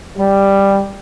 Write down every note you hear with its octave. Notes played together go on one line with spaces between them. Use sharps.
G3